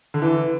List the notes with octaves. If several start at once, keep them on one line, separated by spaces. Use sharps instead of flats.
D3
E3